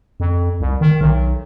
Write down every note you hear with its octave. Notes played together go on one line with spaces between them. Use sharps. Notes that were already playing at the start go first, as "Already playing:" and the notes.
F2
C2
D#3
B1